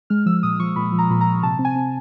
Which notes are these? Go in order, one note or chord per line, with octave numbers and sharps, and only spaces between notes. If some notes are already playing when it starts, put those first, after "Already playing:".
G#3 F6
F3 E6
A#2 D#6
F3 C#6
A#2 B5
F3
A#5
A#2 B5
A#5
A#2
C3 A5
C4
G#5
C4